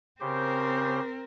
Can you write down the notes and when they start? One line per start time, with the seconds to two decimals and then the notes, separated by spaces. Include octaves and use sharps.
0.21 C#3 C4 G4 A#4 C5